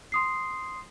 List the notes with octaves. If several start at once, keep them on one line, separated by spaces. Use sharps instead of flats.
C6 D#6 C7